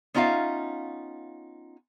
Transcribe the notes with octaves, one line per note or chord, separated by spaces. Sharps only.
B3 C#4 D#4 F4 E5 F5